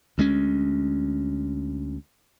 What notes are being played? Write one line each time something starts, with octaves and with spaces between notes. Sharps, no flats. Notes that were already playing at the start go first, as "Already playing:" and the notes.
D2 G#3 C#4